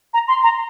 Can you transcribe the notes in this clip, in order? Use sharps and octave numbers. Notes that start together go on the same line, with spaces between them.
A#5
C6
A#5